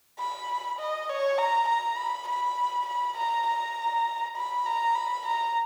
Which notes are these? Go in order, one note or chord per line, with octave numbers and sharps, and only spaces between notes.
B5
D#5
C#5
A#5
A#5
B5
B5
B5
A#5
A#5
B5
A#5
B5
A#5